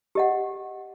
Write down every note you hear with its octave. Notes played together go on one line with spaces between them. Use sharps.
G4 D#5 F#5